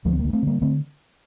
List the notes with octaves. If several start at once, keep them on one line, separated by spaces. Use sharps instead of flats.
D2 F3 A3
C4
D2 G3 A#3
A3 C4
D3 G3 A#3
D3 A3 C4